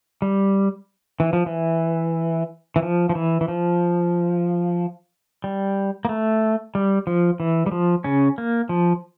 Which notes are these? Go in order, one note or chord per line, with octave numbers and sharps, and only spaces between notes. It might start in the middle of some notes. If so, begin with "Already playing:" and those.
G3
E3
F3
E3
E3
F3
F3
E3
E3
F3
G3
A#3
A3
G3
F3
E3
G3
F3
C#3 C#4
A#3
F3